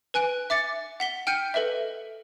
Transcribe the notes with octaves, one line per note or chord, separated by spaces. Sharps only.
B4 G#5 F#6 D7
E5 D6 A6 C#7
F#5 B6 G7
G5 F6 G6 C#7 D#7
A4 B4 D#5 E5